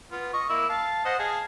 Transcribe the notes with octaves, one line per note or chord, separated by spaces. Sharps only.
B3 F4
D#5 C#6
A#3 E4 E6
F5 A5
C5 D#5 F#5
G#4 F5 A5